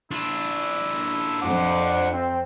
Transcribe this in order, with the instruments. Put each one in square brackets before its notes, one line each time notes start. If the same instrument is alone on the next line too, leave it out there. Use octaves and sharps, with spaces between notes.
[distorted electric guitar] D4 F4 [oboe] E4
[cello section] F2 [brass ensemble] C5 F#5 [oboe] D6
[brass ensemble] C4